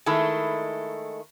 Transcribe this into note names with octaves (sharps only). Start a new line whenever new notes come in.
D#3 G#3 A3 E4